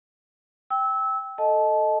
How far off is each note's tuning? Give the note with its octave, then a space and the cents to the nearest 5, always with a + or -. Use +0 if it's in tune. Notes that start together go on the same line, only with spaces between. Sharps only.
G5 -5 E6 -20
A4 +0 D#5 +0 A5 -25